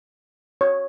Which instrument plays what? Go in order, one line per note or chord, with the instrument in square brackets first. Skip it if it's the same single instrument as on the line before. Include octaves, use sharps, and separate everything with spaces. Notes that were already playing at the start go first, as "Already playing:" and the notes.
[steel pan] C#5